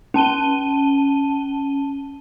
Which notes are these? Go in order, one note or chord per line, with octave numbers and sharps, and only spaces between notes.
C#4 A5 D#7 G7